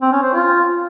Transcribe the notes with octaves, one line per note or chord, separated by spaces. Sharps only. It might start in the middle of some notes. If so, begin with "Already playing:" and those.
C4
C#4
C5
F4